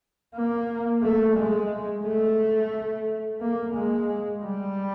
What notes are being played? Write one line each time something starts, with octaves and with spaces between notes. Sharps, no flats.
A#3
A3
G#3
A3
A#3
G#3
G3